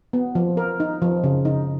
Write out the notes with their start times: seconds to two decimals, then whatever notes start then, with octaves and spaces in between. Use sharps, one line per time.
0.13 B3
0.35 F3
0.57 A#4
0.80 D#4
1.02 F3
1.24 C#3
1.45 D#4